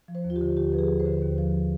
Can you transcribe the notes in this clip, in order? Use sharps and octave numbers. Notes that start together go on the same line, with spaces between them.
F3
C5
D#2
F4
G4
D3
D#2 G4
F3 B4
G#4
D#2
C5
D3
D#2
F3